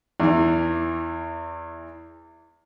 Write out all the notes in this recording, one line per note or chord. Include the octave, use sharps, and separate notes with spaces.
E2 E3